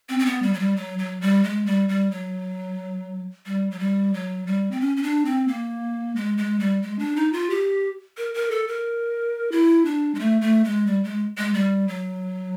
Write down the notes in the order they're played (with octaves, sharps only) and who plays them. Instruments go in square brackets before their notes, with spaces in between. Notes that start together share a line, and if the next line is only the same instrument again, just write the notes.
[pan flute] C4
C4
B3
G3
F#3
G3
F#3
F#3
G3
G#3
G3
G3
F#3
G3
F#3
G3
F#3
G3
C4
C#4
C#4
D4
C4
A#3
G#3
G#3
G3
G#3
D4
D#4
F4
G4
A#4
A#4
A4
A#4
E4
D4
G#3
A3
A3
G#3
G3
G#3
G#3
G3
F#3